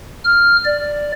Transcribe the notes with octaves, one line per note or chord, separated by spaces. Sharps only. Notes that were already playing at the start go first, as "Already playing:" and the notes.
F6
D5